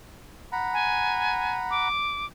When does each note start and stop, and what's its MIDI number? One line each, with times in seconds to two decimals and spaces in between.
0.52 1.88 78
0.52 1.88 82
0.52 1.88 83
0.73 1.60 80
1.71 2.26 86